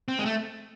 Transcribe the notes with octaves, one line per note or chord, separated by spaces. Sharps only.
C4
G#3
A3